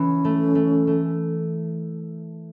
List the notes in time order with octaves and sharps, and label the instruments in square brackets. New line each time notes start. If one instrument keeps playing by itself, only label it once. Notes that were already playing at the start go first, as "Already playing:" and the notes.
Already playing: [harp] E3 [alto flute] C#4
[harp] A3
A3
A3